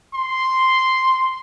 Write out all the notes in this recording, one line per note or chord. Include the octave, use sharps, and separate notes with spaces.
C6